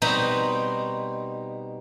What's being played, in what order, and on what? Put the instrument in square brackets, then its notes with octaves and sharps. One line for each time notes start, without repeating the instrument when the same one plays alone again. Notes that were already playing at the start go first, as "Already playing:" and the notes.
[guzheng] B2 G3 C4 D#4 B4 A#5